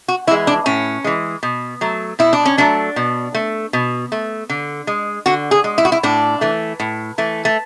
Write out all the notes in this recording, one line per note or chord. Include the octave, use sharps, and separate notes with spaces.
F#4
E3 G#3 E4
D4
A2 C#4
E3 G#3
B2
F#3 A3
B2 E4
D4
C#4
F#3 A3 D4
B2
A3
B2
A3
D3
G#3
D3 F#4
G#4
G#3
E4
F#4
E4
A2 D4
E3 A3
A2
E3 A3
A3